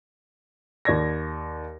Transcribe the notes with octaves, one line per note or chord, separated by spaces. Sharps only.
D#2 D5 G#6 A#6